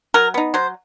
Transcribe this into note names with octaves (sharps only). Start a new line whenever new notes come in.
F#3 A#4
B3 D#4
F#3 C5